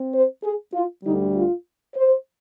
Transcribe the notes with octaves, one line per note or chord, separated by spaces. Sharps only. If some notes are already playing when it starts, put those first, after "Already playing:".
Already playing: C4
C5
G#4
F4
D2 D3 G3 D#4
F4
C5